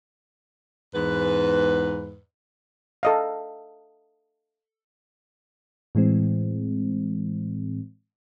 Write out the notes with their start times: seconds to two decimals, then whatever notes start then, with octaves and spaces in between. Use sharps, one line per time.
0.94 E2 G#2 B4
3.03 A4 D#5 F5
5.95 A2 E3 G#3 C4